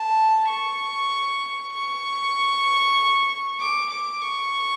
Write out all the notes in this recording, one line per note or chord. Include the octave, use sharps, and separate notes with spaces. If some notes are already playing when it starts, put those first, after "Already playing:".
Already playing: A5
C#6
C#6
D6
D6
C#6